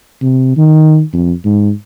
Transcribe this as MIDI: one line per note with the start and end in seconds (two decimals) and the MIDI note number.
0.22 0.56 48
0.57 1.02 51
1.13 1.33 41
1.45 1.71 44